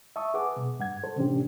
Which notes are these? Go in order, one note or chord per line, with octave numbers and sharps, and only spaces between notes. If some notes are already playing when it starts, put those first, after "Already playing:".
E5 A5 C#6 D#6
G#4 B4 F#5 D6
B2
G2 F#5 G#6
A4 C5
A2 C3 E3 C#4 D4 G4